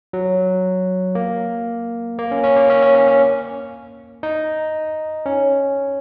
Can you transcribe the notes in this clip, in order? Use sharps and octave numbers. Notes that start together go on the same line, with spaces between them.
F#3
A#3
A#3
C#4
C#4
A#3
C#4
C#4
C#4
C#4
D#4
C#4